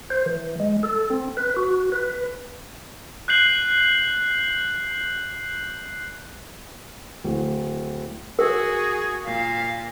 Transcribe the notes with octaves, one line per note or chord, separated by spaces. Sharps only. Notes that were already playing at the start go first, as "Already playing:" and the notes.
C5
E3
G#3
A4
C4
B4
F#4
B4
F#6 G6 C7 F#7
D1
F#4 G#4 A#4
A#2 F5